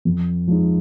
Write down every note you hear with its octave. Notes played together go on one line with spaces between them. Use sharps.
F2
F3 G#3 D#4